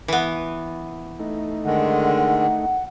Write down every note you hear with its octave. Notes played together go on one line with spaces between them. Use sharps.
E3 B3
A3 D#4
D3 D#3 G#3 F#5